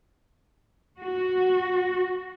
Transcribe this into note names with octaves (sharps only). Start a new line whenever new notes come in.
F#4